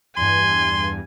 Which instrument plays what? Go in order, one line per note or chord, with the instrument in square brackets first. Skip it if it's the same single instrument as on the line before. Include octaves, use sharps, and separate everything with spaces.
[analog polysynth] E2 G2 [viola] G#5 [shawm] C6